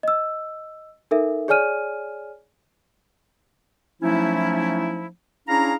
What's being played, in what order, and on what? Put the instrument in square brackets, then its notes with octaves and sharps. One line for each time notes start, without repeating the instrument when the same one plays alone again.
[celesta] D#5 E6
D#4 A4 A#4 E5
G#4 C#5 D5 G#5 F6 D#7
[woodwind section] F3 F#3 A3 C#4 D#4 E4
C#4 D4 E4 G#4 F5 A#5